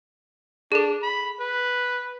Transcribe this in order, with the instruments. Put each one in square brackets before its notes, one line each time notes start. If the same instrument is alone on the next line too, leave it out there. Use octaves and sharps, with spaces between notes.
[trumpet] D4 [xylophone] G#4 A4
[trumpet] B5
B4